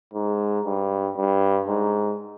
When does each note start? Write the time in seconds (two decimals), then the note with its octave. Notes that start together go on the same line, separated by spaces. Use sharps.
0.14 G#2
0.65 G2
1.17 G2
1.68 G#2